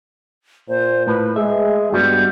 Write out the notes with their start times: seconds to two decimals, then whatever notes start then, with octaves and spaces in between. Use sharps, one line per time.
0.69 A#2 C5
1.07 A2 B4
1.36 G#3 G#4 E5
1.92 G2 G3 B3 F#4